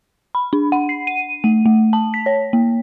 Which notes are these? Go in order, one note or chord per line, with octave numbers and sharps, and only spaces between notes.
B5
D4
F#5
C7
D#7
A3
A3
A5
B6
C#5
A#3